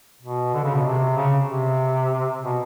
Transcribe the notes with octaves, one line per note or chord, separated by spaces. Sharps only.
B2
D3
C#3
B2
C3
C#3
C3
B2